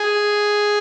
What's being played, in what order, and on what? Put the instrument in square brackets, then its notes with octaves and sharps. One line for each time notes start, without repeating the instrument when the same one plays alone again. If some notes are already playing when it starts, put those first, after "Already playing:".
Already playing: [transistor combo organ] G#4